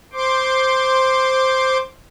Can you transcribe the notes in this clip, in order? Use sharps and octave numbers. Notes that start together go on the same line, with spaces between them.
C5 C6 D6